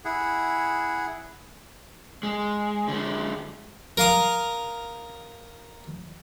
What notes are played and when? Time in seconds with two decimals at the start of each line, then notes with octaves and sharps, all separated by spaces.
0.05 E4 G#4 F#5
2.23 G#3
2.88 D3 G#3
3.97 A#4 F5 D#6